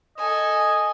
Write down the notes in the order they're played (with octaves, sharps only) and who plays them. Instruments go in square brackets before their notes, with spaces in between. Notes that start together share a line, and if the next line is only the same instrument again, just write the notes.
[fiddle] A4 G#5 [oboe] D#5